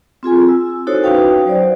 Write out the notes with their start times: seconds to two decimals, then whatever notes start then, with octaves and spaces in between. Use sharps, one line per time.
0.23 C4 F4 G#4 G#5
0.48 E6
0.87 D#4 E4 F#4 A4 C5 C#5
1.04 C#4 D#4 F#4 B4 F5 G5
1.46 F#3 C5 D5